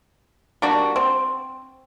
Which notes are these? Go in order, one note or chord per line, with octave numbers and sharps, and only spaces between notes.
G3 A#3 D4 F#4
C4